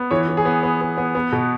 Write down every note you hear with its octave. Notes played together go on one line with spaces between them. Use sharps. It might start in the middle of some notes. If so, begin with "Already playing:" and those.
Already playing: B3
E3 C#5
E3
G#4
B3
B3
B3
B3
B3
B2